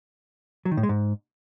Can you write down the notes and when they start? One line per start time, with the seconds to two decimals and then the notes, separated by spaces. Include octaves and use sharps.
0.65 F#3
0.71 D#3
0.77 A2
0.83 G#3
0.89 G#2